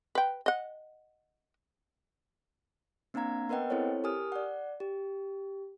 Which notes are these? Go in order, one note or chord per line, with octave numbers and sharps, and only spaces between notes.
B4 G5
D#5 F#5
A#3 C4 D4 F5 A#5 G#6
B3 A#4 B4 D#5 F#5 G5
C4 E4 A4 C5 C#5
G4 A#4 G#5 D#6 F6
D5 F#5
G4